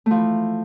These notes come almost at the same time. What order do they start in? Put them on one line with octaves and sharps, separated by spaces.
A3 F3 E3